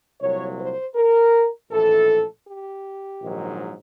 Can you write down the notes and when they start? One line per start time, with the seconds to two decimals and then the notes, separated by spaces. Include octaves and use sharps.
0.21 C2 A#2 F#3 C#5
0.59 C5
0.95 A#4
1.70 A#1 A2 E3 A4
2.46 G4
3.21 A#1 G#2 D#3 F#3